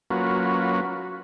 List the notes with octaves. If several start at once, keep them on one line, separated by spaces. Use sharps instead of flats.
F#3 A#3 C#4 F4 F#4 B4